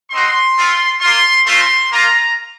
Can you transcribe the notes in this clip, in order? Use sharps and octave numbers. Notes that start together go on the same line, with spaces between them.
C4 D#4 F#4 C6
A3 C4 F4
A#3 F4 C6
A3 C4 F4 C6
A#3 F4 A#5